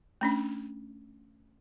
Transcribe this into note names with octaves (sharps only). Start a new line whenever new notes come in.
A3 C#4 D4